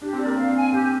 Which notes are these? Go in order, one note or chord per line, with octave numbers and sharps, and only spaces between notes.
D4 G4
C4
D5
A#3
C4 F5
G#5
C4 G4